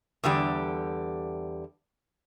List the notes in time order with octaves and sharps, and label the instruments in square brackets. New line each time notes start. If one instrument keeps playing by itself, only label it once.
[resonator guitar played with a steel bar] E2 D3 G3 G4